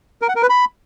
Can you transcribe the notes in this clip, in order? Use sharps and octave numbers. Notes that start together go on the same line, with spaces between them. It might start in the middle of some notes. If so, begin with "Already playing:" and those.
A#4
F#5
A#4
B4
B5